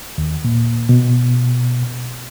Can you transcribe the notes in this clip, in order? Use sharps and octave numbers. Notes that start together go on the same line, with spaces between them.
D#2
A#2
B2